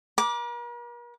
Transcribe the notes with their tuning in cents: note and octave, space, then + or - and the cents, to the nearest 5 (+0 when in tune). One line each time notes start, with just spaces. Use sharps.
A#4 +45 D6 +0